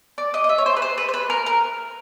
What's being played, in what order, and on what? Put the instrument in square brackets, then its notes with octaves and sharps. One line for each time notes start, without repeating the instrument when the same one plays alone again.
[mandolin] D5
D#5
D#5
E5
C#5
C5
B4
C5
B4
C5
B4
A#4
A#4